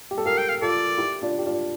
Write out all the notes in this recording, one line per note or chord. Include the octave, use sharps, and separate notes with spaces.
G4
A4
G4 A#4 F5
G5
F5
F4 A4 D5
E4 G4
D4 F4
G4
D4 F4